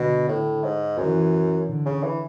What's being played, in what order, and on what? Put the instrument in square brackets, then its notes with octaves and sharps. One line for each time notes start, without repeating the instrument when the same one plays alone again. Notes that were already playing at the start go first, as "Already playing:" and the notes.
Already playing: [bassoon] B2 [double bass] D3
[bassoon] A2
G#2
[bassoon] F#2 [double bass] E3
[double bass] D3
[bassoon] C#3
E3